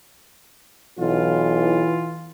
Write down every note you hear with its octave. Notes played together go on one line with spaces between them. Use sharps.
B1 E3 F4